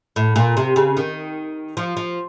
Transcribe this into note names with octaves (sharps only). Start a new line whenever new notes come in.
A2
A#2
C3
C#3
D#3
F3
F3